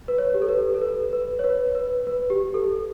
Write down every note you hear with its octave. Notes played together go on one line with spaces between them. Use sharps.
B4
C#5
G4
A4
B4
A4
B4
B4
C#5
B4
B4
B4
G4
A4